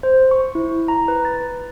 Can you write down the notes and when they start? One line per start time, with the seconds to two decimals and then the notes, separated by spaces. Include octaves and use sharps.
0.03 C5
0.31 C#6
0.55 E4
0.88 A#5
1.08 B4
1.25 A6